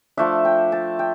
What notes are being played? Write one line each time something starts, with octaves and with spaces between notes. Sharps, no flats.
F3 A3 D4 E5
G5
A5
G5